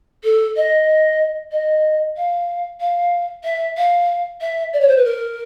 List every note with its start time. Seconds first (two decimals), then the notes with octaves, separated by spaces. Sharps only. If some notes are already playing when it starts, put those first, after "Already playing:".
0.24 A4
0.56 D#5
1.52 D#5
2.17 F5
2.80 F5
3.44 E5
3.77 F5
4.41 E5
4.73 D5
4.80 C#5
4.88 C5
4.97 B4
5.05 A#4